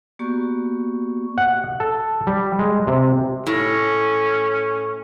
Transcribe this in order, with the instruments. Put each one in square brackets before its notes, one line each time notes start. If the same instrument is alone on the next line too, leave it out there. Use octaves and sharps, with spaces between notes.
[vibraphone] A#3 B3 F#4 G4 D5 C#6
[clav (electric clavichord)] F#5
A4
G3
G#3
C3
[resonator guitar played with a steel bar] A2 [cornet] C#4